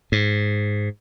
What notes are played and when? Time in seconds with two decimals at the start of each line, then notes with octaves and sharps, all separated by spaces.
0.12 G#2